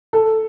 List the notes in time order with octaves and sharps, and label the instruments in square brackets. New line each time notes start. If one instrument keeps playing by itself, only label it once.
[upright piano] A4